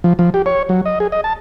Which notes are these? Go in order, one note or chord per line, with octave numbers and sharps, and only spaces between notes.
F3
F3
G4
C#5
F#3
D#5
G#4
D#5
A5